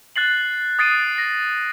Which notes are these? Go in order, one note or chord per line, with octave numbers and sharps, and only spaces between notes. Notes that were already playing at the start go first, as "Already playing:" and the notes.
F#6 A6 C7 F#7
D#6 A6 C7 D7 D#7
A#6